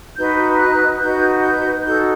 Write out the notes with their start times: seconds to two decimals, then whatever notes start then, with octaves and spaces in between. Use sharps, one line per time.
0.17 D#4 F#4 B4 G6
0.58 F#6
1.01 D#4 F#4 B4 G6
1.42 G6
1.84 D#4 F#4 A4 G6